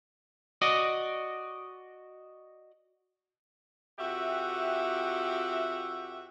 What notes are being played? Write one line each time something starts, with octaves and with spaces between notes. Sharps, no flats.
F#4 D5 D#5
F2 F#4 G4 E5